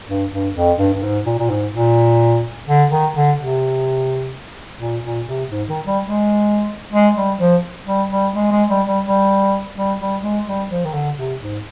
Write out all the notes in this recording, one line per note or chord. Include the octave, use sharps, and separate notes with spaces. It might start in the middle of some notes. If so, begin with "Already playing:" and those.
G2
G2
F2
G2
G2
G#2
A#2
A#2
G#2
A#2
D3
D#3
D3
C3
A#2
A#2
C3
G#2
D#3
G3
G#3
G#3
G3
F3
G3
G3
G#3
G#3
G3
G3
G3
G3
G3
G#3
G3
F3
D#3
D3
C3
G#2